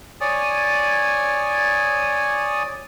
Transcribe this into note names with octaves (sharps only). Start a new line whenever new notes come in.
C#5 D5 G#5 D#6